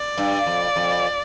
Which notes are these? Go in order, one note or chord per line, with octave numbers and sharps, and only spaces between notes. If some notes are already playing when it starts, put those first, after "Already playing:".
Already playing: D5
G2
F2
F2